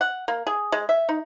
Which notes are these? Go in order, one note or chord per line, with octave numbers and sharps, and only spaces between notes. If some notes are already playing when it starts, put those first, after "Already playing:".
F#5
A#3
G#4
G#3
E5
D#4